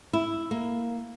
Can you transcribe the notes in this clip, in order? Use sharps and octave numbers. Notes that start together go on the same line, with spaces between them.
E4
A#3